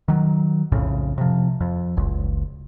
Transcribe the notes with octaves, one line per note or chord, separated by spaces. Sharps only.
D#3 F#3
B1 F2 A2 C#3
C3 F3
F2
F#1 C#2